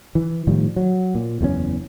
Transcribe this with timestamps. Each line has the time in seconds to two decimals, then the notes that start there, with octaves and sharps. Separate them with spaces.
0.15 E3
0.47 A2 D#3 F3 G3
0.76 F#3
1.15 A#2
1.41 F#1 E2 A2 C#4